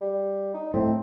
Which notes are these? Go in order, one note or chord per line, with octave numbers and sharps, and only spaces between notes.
G3
D#4
A2 C4